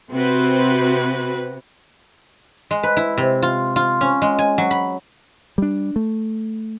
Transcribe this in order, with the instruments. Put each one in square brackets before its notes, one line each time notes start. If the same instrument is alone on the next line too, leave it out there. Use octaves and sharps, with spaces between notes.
[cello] C3 [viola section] C4 F#4 B4
[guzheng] G#3
B4
E4
C3
F4
F4
C#4
G#3
G#5
F#3
B5
[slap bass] G3 D4
A3